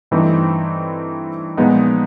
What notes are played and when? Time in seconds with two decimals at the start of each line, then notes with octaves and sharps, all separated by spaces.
0.11 G2 E3 A3 C4 D#4
1.57 A#2 F3 G#3 B3 D#4